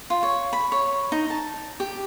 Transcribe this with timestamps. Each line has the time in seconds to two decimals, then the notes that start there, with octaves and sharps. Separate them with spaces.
0.10 F4
0.23 C#5
0.53 B5
0.72 C#5
1.12 D#4
1.30 A5
1.80 G4